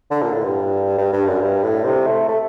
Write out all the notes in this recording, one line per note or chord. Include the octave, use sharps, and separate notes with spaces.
D3
A#2
A2
G2
G2
G2
F#2
G2
A2
C3
A3
A3